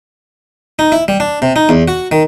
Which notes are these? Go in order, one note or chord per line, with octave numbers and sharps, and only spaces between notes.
D#4
E4
G3
D4
C3
D#4
E2
F#4
D#3